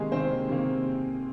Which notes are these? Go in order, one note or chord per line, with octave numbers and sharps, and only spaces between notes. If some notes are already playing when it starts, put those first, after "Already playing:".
Already playing: C3 D#3 G#3 A#3 G4 G#4
C3 D#3 A#3 C4 C5
C3 D#3 A#3